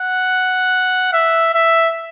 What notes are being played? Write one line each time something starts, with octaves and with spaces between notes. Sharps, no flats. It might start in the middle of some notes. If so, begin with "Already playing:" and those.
Already playing: F#5
E5
E5